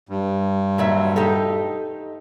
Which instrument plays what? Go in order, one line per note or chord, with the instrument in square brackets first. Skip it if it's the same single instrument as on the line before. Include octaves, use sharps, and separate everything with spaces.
[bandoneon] G2
[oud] D#2 F#3 E5
D#4 G4 A4